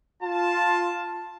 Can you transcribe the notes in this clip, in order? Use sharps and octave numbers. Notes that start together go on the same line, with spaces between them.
F4 A5